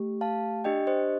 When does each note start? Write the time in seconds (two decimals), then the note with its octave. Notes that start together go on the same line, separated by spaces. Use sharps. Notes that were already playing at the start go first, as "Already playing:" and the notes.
Already playing: A3 G4
0.21 F5 A5
0.64 D4 G4 D#5 G5
0.87 C5 D#5